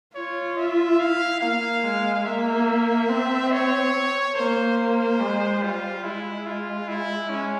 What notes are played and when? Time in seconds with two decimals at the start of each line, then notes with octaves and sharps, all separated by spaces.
0.15 F4 C#5
0.57 E5
0.99 E4 F5
1.41 A#3 F5
1.84 G#3
2.25 A#3 E5
2.67 E5
3.09 C4
3.52 C#5
4.35 A#3 C5
4.78 C5
5.20 G#3
5.62 G3 F4
6.04 G#3 E4
6.46 F4
6.88 E4
7.29 G#3 C#4